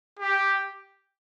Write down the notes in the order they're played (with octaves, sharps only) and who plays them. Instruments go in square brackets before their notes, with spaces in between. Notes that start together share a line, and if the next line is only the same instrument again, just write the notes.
[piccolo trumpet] G4